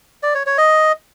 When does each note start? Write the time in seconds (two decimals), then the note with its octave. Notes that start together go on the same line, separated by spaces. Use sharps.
0.23 D5
0.35 C#5
0.46 C#5
0.58 D#5